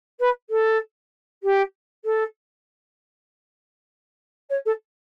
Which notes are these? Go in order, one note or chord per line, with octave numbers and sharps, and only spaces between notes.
B4
A4
G4
A4
C#5
A4